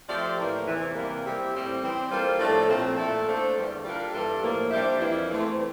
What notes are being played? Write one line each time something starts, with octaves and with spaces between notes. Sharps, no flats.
F3 A3 C4 G4 D5
A2 E3 A#3
E2 C3 E3
C3 G3 A#3
G3 C4 E4 G4
A2 G3 C4
E3 G3 C4
G3 A#3 F4 A4 C5
A2 F3 A3 D4 A4
A#2 F3 A3 C4
A#2 A3 E4 A4
A3 D4 A4 C5 F5
E2 D3 G3
G3 A#3 D4 F4 A#4
G2 E3 G3 D4 A4
A2 F3 A#3
G3 D4 G4 C5 E5
F2 E3 A#3 E4
E2 E3 A3 C4
E3 G3